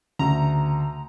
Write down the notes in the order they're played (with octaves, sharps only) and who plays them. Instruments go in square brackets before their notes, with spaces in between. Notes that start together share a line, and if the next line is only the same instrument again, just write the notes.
[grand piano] D2 [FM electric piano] C#3 [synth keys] A#5